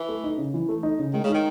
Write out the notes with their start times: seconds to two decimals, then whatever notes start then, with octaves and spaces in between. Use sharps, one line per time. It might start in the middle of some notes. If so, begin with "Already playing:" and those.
Already playing: E3
0.09 A3
0.24 D#4
0.38 C#3
0.54 E3
0.69 A3
0.83 D#4
0.99 C#3
1.13 D#3 G#3
1.24 C#3
1.29 D#4
1.34 D#3